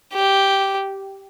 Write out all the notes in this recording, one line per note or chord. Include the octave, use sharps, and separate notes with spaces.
G4